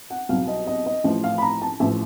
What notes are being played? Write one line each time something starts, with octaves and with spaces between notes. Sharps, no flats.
F#5
C2 B2 F#3 F5
D#5
D#5
D#5
A1 A2 F3
F5
B5
A#5
A5
A1 A2 F3 E5